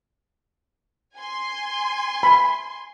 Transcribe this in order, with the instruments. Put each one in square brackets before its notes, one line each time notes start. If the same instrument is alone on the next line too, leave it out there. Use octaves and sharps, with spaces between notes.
[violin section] G#5 C6
[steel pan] B5